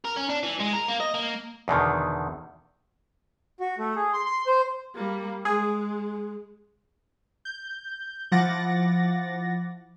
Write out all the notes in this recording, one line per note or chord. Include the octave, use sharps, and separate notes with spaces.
A#4
C#4
D4
E3
G#3
A#4
A#3
D#5
A#3
E2 B2 D3 D#3
F#4
A3
G#4
C6
C6
C5
G3 A#3
G#3 G#4
G6
F3 E4 F#5 D6 A6 A#6